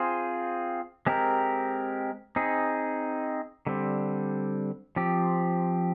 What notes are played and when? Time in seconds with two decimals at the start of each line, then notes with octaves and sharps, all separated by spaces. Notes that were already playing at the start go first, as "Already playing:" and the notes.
Already playing: C4 F4 G#4 C5
1.06 G#3 C4 G4 A#4
2.36 C4 D#4 G#4
3.67 D3 G3 C4
4.96 F3 C4 G4